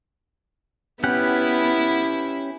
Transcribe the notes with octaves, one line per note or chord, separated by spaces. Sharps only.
B3 C#4 E4 G4 F#5